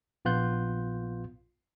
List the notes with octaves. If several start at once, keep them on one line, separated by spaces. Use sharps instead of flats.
A#1 B3 F4 F#6 G6